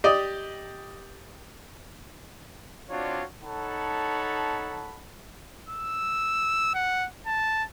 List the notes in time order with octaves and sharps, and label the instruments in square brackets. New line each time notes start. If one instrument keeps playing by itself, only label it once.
[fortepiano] G4 D5 D#5
[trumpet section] C4 D4 F4 F#4 C#5 D5
D#4 A4 C#5 F#5 A5 B5
[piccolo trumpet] E6
F#5
A5